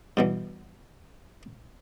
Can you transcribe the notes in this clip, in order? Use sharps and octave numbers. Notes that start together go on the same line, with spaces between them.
G2 B2 E3